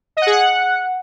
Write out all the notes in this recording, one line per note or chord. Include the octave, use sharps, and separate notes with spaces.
D#5
F#5
G#4
F#5